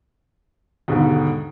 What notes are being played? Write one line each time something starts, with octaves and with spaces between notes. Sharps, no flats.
D#2 G#2 B2 D3 D#3